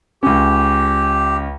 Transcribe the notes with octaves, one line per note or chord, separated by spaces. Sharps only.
C#2 C#4 G4